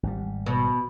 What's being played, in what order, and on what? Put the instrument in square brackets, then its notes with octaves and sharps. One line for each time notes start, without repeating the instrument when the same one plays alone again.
[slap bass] G#1 G3
[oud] B2